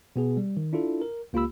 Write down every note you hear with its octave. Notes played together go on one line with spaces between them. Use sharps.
B2 B3 G#4
G3
D#3
D4 E4 F4 A4
A#4
C#2 A#3 F4 G4 B5 E6